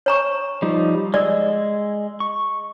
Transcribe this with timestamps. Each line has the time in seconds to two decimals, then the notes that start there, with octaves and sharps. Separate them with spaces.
0.06 C#5 A#5 C#6
0.62 F3 G3 D#4
1.14 G#3 D5 D#5 E6
2.20 C#6